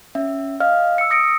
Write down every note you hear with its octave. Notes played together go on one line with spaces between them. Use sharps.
C#4 E5
D#5 F5 F6
E6 C#7
D#6 A#6 C#7 D7